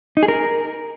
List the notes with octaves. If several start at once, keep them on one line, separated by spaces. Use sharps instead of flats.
D#4
G#4
A#4